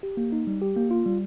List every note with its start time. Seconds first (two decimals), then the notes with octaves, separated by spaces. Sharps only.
0.03 G4
0.17 A#3
0.32 D#4
0.47 G3
0.62 G4
0.76 A#3
0.91 F4
1.06 G3